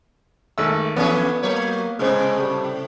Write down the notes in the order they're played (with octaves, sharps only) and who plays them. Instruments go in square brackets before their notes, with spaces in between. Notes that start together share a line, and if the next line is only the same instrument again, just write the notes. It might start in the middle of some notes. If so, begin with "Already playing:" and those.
[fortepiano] G#1 A3 E6 [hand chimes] E5
[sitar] F2 E3 C#4 [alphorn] D3 [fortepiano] B3 [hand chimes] B4 D5
[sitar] F#3 C#5 [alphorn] A#3
[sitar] A2 C3 [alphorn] G#3 [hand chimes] C5 F6
[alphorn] G3